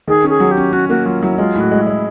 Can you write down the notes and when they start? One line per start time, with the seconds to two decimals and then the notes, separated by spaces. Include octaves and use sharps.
0.08 D#3 G#4
0.24 C#4
0.30 G#4
0.40 F#3
0.51 G4
0.57 C#4
0.73 C#4 F#4
0.89 A#3 F#4
1.06 F#3 F4
1.22 F#3 E4
1.38 G#3 F4
1.55 A2
1.60 F#4
1.71 G#3
1.82 G#3 E4